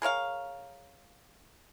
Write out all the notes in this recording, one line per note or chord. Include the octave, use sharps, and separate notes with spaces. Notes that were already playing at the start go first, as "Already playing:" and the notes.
G#4 A#4 C#5 F5